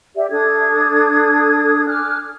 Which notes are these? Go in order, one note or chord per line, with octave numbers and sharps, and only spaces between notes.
G4 D5 E5
D4 A4 D#6 G#6
G#5 D6 F6 F#6